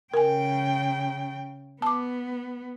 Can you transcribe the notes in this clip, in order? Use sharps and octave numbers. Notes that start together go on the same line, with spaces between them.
C#3 A#4 G5 G#5
B3 A5 D6